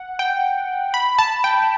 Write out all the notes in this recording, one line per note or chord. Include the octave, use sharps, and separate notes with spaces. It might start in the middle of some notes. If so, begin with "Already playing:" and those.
Already playing: F#5
G5
B5
A5
G5